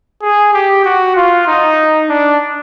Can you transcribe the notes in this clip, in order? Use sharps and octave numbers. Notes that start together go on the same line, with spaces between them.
G#4
G4
F#4
F4
D#4
D4